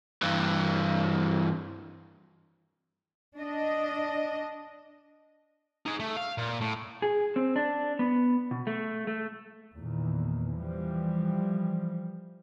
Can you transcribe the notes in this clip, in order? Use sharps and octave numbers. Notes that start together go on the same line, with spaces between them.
G2 E3
D4 D#5
D#4 G#4
A3
F5
A#2
A2
G#4
C4
D4
B3
B2
A3
A3
E2 A#2 D#3
E3 F3 G3